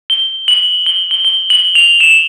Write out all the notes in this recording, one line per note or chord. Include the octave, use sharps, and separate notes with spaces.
G7
F#7
G7
G7
G7
F#7
F7
E7